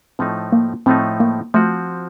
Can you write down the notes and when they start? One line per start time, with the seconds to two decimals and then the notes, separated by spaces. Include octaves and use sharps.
0.19 A2 F3 A3 C4 D#4
0.52 A#3
0.86 A2 F3 A3 C4 D#4
1.20 A#3
1.54 F3 A3 C4 F#4